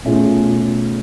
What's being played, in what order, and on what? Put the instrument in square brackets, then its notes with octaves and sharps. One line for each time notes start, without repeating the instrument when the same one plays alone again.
[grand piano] B2 A3 C#4 F4 G#4